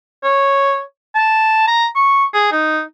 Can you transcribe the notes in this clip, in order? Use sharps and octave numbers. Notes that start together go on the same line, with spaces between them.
C#5
A5
A#5
C#6
G#4
D#4